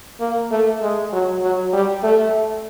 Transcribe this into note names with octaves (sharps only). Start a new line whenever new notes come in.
A#3
A3
G#3
F#3
F#3
G3
A3